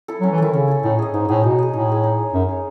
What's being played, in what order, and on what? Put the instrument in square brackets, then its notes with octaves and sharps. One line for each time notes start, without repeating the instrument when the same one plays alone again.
[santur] E4 A4
[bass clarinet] F#3 [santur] C#4
[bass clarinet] E3
[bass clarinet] D#3 [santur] E4 A4
[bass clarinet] C#3 [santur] C#4
[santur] E4 A4
[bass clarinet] A2 [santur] D#4
[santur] G#4 D#5
[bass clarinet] G#2 [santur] D#4
[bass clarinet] A2 [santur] G#4 D#5
[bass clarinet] B2 [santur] D#4
[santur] G#4 D#5
[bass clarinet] A2 [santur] D#4
[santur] G#4 D#5
D#4
G#4 C#5
[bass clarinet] F#2 [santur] D#4
[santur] G#4 C#5